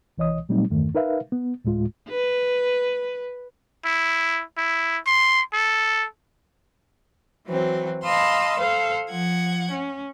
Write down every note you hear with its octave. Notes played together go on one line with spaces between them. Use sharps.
C2 E3 C#5 D#5 D#6
A#2 F#3 G3 A3 C4 D#4
E2 G2 D#3 A3
D#4 A#4 B4 E5 F5
B3
D2 A2 G#3 F4
B4
E4
E4
C6
A4
E3 F#3 C4
D#5 F5 A5 B5 C6 E6
A4 C5 F5
F3 F#5 G#6
C#4